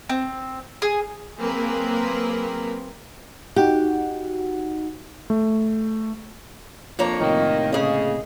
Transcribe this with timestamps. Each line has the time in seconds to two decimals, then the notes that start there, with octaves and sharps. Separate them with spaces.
0.09 C4
0.82 G#4
1.38 F#3 A#3 C4 G#4 A#4 B4
3.56 D#4 F#4 G4 F#5
5.30 A3
6.99 F2 A#3 D4 C#5 A#5
7.20 A2 C3 D#3 A#3
7.73 C#3 G#4 D#5